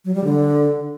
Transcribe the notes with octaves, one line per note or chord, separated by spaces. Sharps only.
F#3
G3
D3